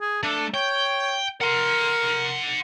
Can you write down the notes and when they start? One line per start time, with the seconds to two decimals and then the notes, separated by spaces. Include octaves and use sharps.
0.01 G#4
0.23 A3 D4
0.54 C#5 G5
1.41 A#4 F#5 C6